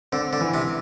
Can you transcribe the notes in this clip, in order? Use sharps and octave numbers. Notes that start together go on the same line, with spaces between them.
D3 C4
D3
E3
C3